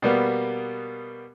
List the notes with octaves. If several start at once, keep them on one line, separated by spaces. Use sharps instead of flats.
B2 G3 A#3 B3